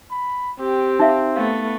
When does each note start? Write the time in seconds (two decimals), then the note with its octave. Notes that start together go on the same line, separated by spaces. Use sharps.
0.11 B5
0.59 C4 G4
0.99 D#4 E5 F5
1.36 A3 B3 F5